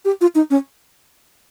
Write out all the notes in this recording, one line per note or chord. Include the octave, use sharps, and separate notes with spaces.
G4
F4
D#4
C#4